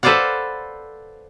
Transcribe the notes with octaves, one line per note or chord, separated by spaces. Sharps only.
A4 B4 C5 D5 F5 F#5